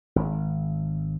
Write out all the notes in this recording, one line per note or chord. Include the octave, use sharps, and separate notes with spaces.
G#1